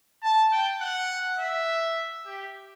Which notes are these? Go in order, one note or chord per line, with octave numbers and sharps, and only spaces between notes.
A5
G5
F#5
E5
G4